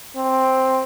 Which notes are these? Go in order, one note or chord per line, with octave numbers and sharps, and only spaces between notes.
C4